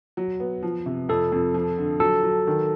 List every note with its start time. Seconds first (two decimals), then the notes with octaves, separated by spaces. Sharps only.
0.17 F#3
0.40 B3
0.63 F3
0.86 C3
1.09 F2 A4
1.32 F2
1.54 F3
1.78 D3
2.00 F#3 A4
2.23 F#3
2.47 D#3